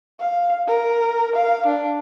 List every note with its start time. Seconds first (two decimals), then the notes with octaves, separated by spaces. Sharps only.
0.20 F5
0.67 A#4
1.36 F5
1.66 D4